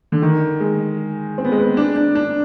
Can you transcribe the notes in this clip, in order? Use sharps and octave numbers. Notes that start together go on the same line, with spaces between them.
D3
D#3
G#3
C4
B3
G#3
B3
D4
D4
D4